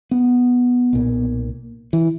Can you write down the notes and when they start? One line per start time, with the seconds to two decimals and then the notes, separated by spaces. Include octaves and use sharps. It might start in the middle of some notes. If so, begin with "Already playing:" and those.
0.11 B3
0.93 B1 A#2
1.93 E3